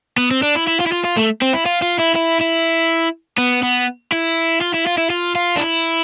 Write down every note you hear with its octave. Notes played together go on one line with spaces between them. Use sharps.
B3
C4
D4
E4
E4
F4
E4
F4
F4
A3
C4
E4
F4
F4
E4
E4
E4
B3
B3
E4
F4
E4
F4
E4
F4
F4
D4
E4